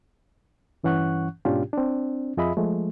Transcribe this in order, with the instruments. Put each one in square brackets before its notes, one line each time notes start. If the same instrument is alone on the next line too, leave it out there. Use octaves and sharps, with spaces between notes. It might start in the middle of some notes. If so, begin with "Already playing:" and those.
[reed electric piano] G2 E3 C#4 F#5 C#6 F#6
G#2 B2 C#4 D4 F4 G4
C4 D4
F2 F4 G#4 D#5 E5 B5
F3 G#3 A3